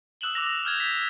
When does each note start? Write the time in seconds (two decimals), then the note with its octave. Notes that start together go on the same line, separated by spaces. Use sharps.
0.21 D#6 E6 F#6 E7 F#7 G7
0.34 D6 E6 F#6 A#6 F7
0.65 F6 G6 G#6 F7
0.80 B6